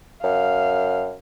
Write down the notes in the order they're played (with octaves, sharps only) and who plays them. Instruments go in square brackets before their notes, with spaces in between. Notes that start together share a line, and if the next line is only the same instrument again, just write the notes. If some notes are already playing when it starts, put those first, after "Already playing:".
[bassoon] F#2 [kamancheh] F5